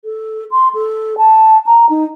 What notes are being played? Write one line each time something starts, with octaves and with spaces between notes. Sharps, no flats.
A4
C6
A4
A5
A#5
D#4